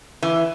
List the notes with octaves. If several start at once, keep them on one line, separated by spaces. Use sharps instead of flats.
E3